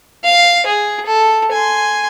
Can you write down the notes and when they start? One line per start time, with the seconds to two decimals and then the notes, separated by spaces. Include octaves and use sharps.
0.24 F5
0.66 G#4
1.06 A4
1.52 G#5 C6